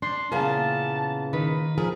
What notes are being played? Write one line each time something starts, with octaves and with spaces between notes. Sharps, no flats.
D4 C6
A#2 C#3 E3 B3 A#4 A5
D#3 B4
F3 G#4 A#4